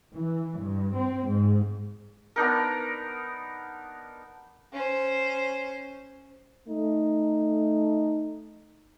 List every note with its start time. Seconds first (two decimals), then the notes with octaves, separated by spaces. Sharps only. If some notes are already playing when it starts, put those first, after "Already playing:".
0.14 E3
0.58 G2
0.94 C4
1.28 G#2
2.36 B3 D4 D#4 A#4
4.73 C#4 C5
6.68 A3 D#4